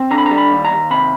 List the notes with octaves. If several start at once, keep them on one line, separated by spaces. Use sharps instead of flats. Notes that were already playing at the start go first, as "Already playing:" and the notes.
Already playing: C4
D3 A#5
B5
A#5
G3
B5
D#2
A#5
D#2
C3 B5